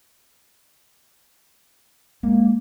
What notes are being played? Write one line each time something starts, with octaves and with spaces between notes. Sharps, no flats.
G#3 A#3